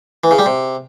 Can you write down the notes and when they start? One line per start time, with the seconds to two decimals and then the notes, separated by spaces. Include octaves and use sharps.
0.24 E3
0.31 C#3
0.39 G3
0.46 C3